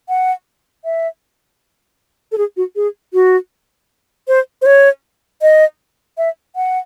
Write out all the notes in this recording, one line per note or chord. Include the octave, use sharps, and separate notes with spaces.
F#5
E5
A4
G#4
F#4
G#4
F#4
C5
C5
C#5
D#5
E5
F#5